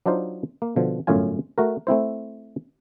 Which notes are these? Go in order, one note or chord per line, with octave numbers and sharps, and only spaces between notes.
F#3 D4 D#4 F4 C5
A#3
B2 D3 F3
G1 F#2 A2 C#4 F4 G#5
A3 F#4 A#4
A3 C4 E4 C5